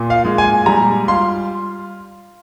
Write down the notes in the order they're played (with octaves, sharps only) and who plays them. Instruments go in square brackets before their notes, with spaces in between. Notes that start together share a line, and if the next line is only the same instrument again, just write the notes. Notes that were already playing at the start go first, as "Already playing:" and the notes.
Already playing: [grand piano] A#2
F5
G#3
G#5
G3 A#5
F4 C6